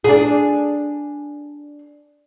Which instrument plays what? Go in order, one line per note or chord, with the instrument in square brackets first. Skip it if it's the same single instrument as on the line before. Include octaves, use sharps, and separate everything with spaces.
[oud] D4 G#4